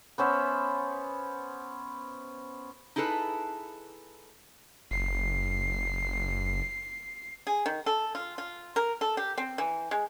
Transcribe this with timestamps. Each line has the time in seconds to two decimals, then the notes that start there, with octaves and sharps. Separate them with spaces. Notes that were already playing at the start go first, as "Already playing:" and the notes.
0.18 B3 C#4 C5 E5
2.96 D#4 E4 G#4 A4 B4
4.91 F#1 C7
7.47 G#4
7.66 D#3
7.86 A4
8.15 F4
8.38 F4
8.76 A#4
9.01 A4
9.17 G4
9.38 C4
9.58 E3
9.91 G#3